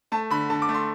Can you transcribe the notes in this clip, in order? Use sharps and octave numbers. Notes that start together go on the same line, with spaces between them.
A3 A5
D3 B5
D3 A5
D6
A3
C6